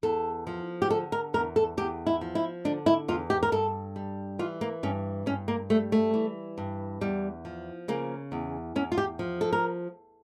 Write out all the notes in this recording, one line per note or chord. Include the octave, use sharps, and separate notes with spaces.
E2 A4
F3
G4
D3 A4
A#4
E2 A#4
A4
E2 G4
E4
F3
E4
D3 D4
E4
E2 F4
G4
A#4
G2 A4
G3
E3 F4
A#3
G2 C#4
G2 C#4
A#3
G3 A3
A3
E3
G2
E2 G3
F3
C#3 A#3
E2
E2 C#4
F4
G4
F3
A4
A#4